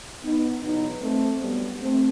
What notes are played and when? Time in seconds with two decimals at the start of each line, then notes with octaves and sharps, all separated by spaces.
0.22 B3 D#4
0.62 E2 B2 F#3 B3 D#4
1.01 A3 C4
1.41 G2 F#3 G3 B3
1.81 A3 C4